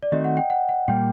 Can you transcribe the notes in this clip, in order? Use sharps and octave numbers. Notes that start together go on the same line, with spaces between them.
D5
D#3 A3 C4 D#4 F#4 D#5
F#5
G5
F#5
F#5
A#2 G3 A#3 G5